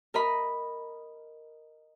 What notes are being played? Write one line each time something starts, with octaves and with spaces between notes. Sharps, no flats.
A#4 D#5 B5